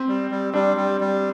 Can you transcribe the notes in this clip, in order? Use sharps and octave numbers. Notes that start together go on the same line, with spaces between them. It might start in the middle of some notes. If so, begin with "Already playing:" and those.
Already playing: C4
G3
G3
G3 D4
G3
G3